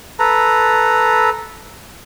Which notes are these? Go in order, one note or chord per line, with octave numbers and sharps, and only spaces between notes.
A4 B4 A#5